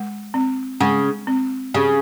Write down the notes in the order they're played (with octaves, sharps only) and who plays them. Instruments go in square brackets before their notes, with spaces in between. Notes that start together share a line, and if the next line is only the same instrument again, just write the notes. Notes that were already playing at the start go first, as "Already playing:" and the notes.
Already playing: [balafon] G#3
C4
[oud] C#3 [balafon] G#3
[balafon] C4
[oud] C#3 [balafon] G4